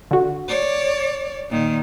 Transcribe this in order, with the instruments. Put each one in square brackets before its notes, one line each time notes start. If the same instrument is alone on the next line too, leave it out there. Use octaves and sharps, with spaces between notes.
[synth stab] D3 F#4
[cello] C#5 D5
A#2 D#3